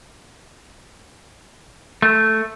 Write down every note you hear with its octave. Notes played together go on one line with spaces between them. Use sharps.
A3